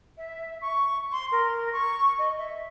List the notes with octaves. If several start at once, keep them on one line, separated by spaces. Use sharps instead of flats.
E5
C#6
C6
A#4
C#6
D#5
E5